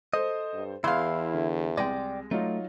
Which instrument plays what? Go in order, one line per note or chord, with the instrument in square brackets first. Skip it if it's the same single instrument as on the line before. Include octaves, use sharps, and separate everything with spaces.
[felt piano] A4 C5 [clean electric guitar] D#5
[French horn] G2
[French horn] E2 [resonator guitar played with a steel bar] E3 F5 [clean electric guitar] E4 [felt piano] C6 F6
[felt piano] D3
[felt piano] C2 A#6 [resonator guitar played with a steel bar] G#3 [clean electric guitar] D5 G5
[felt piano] F#3 D#4 F4 [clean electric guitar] A3